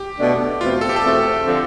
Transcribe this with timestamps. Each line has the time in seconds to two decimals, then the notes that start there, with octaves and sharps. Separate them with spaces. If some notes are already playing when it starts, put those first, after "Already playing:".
Already playing: G4
0.18 B2 A3 D4
0.60 E2 B2 A3 C4 F4
0.81 A4
0.89 G4
0.96 A4
1.03 E2 B2 A3 C4
1.46 D3 F3 C4